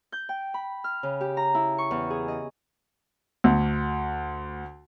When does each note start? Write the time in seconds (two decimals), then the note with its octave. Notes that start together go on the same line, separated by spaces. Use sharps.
0.12 G6
0.29 G5
0.54 B5
0.84 F6
1.03 C#3
1.21 G4
1.37 A#5
1.55 E4
1.78 C#6
1.91 E2
2.10 G#4
2.28 D#5
3.44 D2